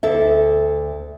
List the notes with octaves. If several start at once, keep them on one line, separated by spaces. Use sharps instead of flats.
D2 A4 E5